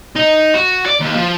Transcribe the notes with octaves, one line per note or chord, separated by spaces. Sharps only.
D#4
F#4
D5
D#2
F3